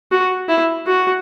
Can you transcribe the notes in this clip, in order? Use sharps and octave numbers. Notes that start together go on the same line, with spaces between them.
F#4
E4
F#4